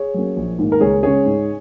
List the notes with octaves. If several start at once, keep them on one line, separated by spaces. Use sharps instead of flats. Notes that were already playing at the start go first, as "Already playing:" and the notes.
Already playing: G#4 C#5
F#3 A#3 C#4
A#1
G#2 D#3 A#3
A#4
C#2 G#4 C#5
C#3 G#3 C#4 G#4 C#5
G#2